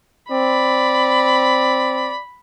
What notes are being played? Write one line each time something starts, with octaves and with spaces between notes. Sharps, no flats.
C4 D5 B5